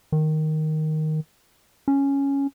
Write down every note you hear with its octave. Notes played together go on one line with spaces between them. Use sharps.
D#3
C#4